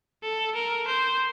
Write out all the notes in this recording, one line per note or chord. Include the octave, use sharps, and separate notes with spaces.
A4
A#4
C5